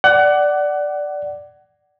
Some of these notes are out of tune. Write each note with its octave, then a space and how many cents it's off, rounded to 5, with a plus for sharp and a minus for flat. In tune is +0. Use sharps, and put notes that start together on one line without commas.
D5 +0 F#5 +25